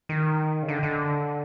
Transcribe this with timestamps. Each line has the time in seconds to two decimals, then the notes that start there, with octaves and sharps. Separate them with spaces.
0.09 D#3
0.63 C#3
0.68 D3
0.83 D3